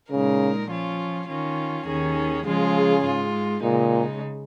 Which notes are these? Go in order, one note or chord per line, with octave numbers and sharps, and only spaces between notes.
A#2 C#3 G#3 D#4 A#4
F3 C#4 F4
D#3 C#4 F4
D#2 D#3 C#4 G#4
C#3 F3 G#3 F4 G#4
G#2 G#3 F4
A#2 C#3 G#3 D#4